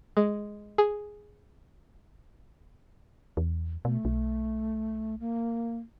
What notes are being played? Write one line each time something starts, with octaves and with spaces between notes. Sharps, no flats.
G#3
G#4
E2
B2 A3
B1
A#3